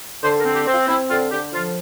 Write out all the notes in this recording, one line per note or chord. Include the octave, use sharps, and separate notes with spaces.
D3 C5
A#4
C4
G4
C4
F4
C4 E4
D3 F4
D3 G4
F3 F4